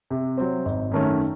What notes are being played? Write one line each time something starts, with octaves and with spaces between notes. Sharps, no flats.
C3
F#3 C4
G#1
F#2 D#3 A3 C#4